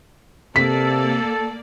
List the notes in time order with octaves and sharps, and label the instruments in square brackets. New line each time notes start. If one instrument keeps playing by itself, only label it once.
[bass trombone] C3 [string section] A#3 D5 [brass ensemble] A4 [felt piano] B6